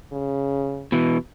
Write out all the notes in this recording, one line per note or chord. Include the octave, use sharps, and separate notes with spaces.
C#3
B2 E3